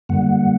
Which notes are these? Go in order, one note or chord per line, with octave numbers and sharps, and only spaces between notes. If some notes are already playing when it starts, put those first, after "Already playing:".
F#2 D3 G3 A#3 F#5